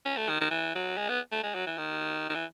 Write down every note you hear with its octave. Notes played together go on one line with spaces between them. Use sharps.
C#4
A3
D#3
D#3
E3
F#3
G#3
B3
A3
G#3
F#3
E3
D#3
D#3
E3